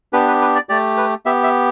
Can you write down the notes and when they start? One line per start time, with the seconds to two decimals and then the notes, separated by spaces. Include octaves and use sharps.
0.13 B3 D4 G4 B4
0.28 B4
0.41 B4
0.55 D5
0.69 A3 G4 D5
0.97 B4
1.26 B3 G4 E5
1.44 E5